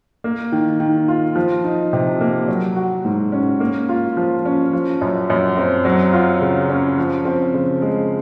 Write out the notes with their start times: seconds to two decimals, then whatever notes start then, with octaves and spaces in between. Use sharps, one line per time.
0.24 A#3
0.52 D#3
0.80 D#3
1.08 F4
1.36 F3
1.64 D#4
1.93 C3
2.20 A#3
2.48 F#3
2.76 F#4
3.05 G#2
3.32 C#4
3.60 A#3
3.89 F4
4.17 F3
4.45 C#4
4.73 F3
5.01 F#2
5.30 F#2
5.57 C4
5.85 F#3
6.13 F4
6.41 C#3
6.70 C#4
6.98 F3
7.25 C4
7.54 C#3
7.82 G#3